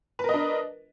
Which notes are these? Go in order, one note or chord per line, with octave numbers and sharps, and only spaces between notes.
D4 A#4 B4 D#5